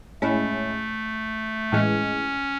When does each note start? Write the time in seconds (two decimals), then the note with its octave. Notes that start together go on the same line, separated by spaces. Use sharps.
0.22 A2 G#3 A3 C#4 E4
1.72 A2 E3 G#3 C#4